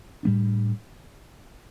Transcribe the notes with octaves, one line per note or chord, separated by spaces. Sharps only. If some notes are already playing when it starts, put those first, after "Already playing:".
A2 G3 B3 D4